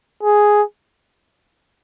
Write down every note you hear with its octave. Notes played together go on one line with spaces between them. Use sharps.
G#4